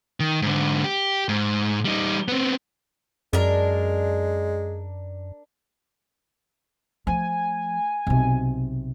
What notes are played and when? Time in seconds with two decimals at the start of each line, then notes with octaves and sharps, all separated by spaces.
0.20 D#3
0.42 G#2 D3
0.84 G4
1.29 G#2
1.85 G3 D#4
2.28 B3 C4
3.33 F#2 G#3 D4 A#4
7.07 F3 A3 G#5
8.07 B1 C3